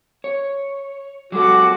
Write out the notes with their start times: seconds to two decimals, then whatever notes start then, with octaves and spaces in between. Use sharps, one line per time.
0.24 C#5
1.32 F#3 G#3 F#4 A4 D6